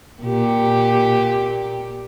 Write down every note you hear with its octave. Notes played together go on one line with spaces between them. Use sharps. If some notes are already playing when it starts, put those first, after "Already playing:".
A#2 G4